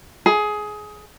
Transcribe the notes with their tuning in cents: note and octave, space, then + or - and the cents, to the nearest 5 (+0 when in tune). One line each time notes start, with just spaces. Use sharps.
G#4 +20